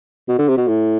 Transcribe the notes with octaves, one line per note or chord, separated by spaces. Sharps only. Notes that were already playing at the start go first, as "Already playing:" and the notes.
B2
D3
C3
B2
A2